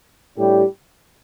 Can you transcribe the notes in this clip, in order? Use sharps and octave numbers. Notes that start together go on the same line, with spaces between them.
A2 G3 D4 G4